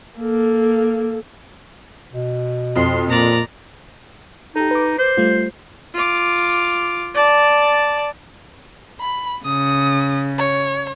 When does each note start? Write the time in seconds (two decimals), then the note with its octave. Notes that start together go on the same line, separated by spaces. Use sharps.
0.19 A#3 A4
2.14 B2
2.76 F2 C6
3.09 A#2 D5 A#5
4.56 D#4 G4 A4
4.71 B4 D6
4.99 C5
5.17 G3 A3 F4
5.94 F4 D6
7.14 D5 A5
9.00 B5
9.45 C#3 D#6
10.38 C#5